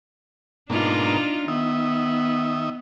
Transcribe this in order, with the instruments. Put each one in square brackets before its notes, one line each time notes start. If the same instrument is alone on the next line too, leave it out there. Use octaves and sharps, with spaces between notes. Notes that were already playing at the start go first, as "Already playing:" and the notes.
[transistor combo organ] G#2 B2 A#3 [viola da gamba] D4 D#4 F4
[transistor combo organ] D#3 D#5 E5 [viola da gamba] B3